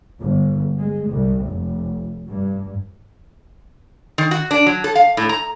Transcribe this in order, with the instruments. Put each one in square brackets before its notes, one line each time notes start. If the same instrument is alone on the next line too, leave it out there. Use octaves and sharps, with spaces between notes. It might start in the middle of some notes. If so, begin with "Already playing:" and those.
[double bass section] G1
G#3
C2
F1
G2
[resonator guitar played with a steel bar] D#3
F#4
D4
F#3
A4
F5
A2
A#5